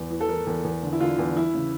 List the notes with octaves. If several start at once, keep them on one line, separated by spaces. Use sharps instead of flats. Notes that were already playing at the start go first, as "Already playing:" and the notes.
Already playing: E2
E3
A4
E3 A#4
E2
E2
D3
E4
D3 F4
E2
E3 E4
C#3